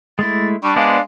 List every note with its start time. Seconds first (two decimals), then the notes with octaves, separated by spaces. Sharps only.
0.19 G#3 A3 E4 A6
0.63 G3 D4 C#6
0.76 G#3 B3 C5 D5 F5